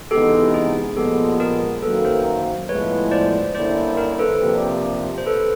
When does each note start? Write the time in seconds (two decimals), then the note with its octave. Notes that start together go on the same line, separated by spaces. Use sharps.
0.11 C3 E3 G#3 B3 D#4 G4 A4
0.54 G#4
0.96 A#2 F3 G#3 B3 G4 A4
1.40 G#4 A#4
1.82 F#2 D#3 F#3 A#3 A4 B4
2.04 A#4 C5
2.68 A2 F3 G#3 B3 E4 B4 C#5
3.12 C5 D5
3.55 D3 G3 A#3 C#4 E4 C5 D5
3.97 A#4 C5
4.19 A4 B4
4.41 C3 F3 A#3 D4 G4
5.18 C5
5.26 A4 B4